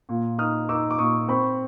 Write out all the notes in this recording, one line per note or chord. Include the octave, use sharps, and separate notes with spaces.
A#2
D#4 D#6 F6
D#4 D6 E6
D6
A#2 C#6 D#6
C4 B5 C#6